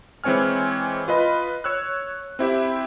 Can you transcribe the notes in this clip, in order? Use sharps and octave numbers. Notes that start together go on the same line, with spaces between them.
E3 G#3 C4 C#5 G#5 F6
F4 B4 D#5 B5
C#5 E6 F#6
C4 E4 G4 E5